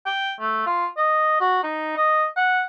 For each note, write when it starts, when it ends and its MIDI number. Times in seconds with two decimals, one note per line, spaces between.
0.06 0.34 79
0.40 0.63 57
0.66 0.86 65
0.97 1.40 75
1.40 1.63 66
1.63 1.97 63
1.97 2.26 75
2.36 2.64 78